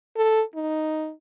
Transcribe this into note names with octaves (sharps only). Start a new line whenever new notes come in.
A4
D#4